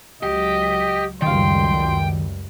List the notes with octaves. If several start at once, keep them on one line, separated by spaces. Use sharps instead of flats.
C#2 F#3 G4 D#5
C#2 F#2 D#3 G3 F5 G5 C6